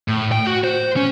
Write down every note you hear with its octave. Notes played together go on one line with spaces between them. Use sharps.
A2
G5
F#4
C5
C#4